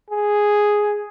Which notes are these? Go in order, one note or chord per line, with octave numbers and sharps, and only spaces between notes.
G#4